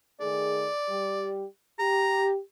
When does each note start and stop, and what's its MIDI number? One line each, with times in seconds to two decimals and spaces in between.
0.21 0.68 51
0.21 0.68 57
0.21 0.68 68
0.21 1.33 74
0.89 1.45 55
0.89 1.45 67
1.79 2.39 67
1.79 2.27 82